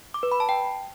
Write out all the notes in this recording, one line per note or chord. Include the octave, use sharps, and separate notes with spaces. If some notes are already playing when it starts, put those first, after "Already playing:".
D6
B4
B5
A5
G5